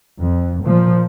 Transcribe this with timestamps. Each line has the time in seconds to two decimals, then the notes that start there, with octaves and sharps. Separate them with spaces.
0.22 F2
0.64 A#2 F3